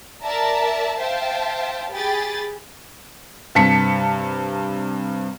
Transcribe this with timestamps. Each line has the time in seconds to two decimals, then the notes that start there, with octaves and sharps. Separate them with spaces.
0.22 A#4 D5 E5 A5 A#5
0.99 C5 E5 F5 G5 A5
1.92 G4 G#4 G5 B5 A6
3.55 G2 C3 A5 B6 C#7